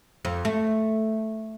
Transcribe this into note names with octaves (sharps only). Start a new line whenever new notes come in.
F2
A3